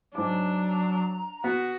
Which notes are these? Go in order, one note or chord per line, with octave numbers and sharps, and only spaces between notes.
G#2 F#3 D4 D6
A#5
B3 F#4